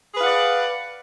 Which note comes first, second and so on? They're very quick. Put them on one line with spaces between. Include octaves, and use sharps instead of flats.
G#4 B4 F5 F#5 D5